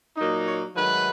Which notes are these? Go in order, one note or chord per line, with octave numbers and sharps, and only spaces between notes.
A#2 F#3 A#3 D#4
C#5
G#2 D#3 F#3 A3 B4